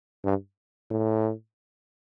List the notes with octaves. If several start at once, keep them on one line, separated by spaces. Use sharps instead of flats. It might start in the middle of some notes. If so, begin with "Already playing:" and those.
G2
A2